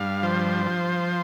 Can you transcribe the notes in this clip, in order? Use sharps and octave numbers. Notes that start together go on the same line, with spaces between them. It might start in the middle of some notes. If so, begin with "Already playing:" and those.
Already playing: G2 F5
F3 C5
F3